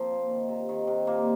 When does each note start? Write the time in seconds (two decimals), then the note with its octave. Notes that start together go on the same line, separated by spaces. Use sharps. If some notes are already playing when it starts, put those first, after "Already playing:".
Already playing: F3 A#3 C4
0.11 A#2
0.29 D#3
0.49 C3
0.69 D#3
0.87 C3
1.07 A#2 A#3